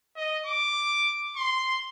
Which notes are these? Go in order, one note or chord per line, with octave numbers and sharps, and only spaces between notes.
D#5
D6
C6